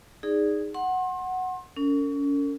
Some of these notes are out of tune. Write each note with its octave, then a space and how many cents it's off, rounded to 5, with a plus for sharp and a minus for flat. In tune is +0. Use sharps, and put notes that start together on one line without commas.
D#4 +0 G#4 -10 D5 +0
F#5 +0 C6 +35
C#4 +30 A#4 -45